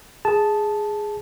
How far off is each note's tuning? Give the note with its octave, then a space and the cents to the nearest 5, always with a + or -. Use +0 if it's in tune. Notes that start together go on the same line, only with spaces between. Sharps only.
G#4 +0 A5 -10